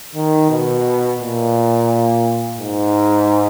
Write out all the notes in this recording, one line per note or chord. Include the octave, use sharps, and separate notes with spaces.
D#3
B2
A#2
G#2